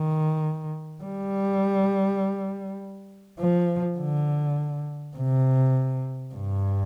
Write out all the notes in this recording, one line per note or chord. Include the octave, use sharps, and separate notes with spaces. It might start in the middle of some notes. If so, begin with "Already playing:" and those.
Already playing: D#3
G3
F3
D3
C3
G2